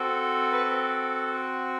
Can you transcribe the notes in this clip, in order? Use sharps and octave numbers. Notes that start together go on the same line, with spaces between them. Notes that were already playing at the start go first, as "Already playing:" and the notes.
Already playing: C4 F#4 A4
B4